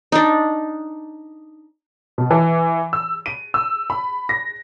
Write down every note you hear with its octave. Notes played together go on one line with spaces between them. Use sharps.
D4 D#4
B2
E3
E6
D#7
E6
B5
A#6